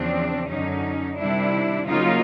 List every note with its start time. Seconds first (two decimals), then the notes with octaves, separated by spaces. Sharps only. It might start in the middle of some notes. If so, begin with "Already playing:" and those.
Already playing: E2 C#3 F3 C4 D4
0.49 F#2 D3 F#3 C#4 D#4
1.17 C3 D#3 G3 D4 E4
1.86 C#3 F#3 A#3 D#4 F4